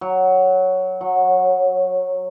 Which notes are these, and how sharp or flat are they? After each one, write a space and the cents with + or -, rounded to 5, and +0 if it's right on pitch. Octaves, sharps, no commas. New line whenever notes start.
F#3 +5
F#3 -15